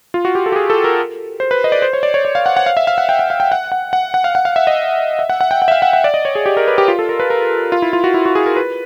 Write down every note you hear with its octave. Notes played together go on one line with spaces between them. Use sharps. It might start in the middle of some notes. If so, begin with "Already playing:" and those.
F4
F#4
G4
A4
G4
G#4
A4
A#4
C5
B4
D#5
D5
C5
C#5
D5
C#5
D5
F5
F#5
F#5
F5
E5
F5
F#5
G5
F#5
F5
G5
F#5
F#5
F#5
F#5
F5
F#5
F5
E5
D#5
E5
F#5
F#5
G5
F#5
E5
F5
F#5
F#5
D5
D#5
C#5
G#4
G4
A#4
B4
G4
F4
A4
A#4
B4
A#4
F4
E4
F4
F#4
E4
F#4
G#4
A#4
B4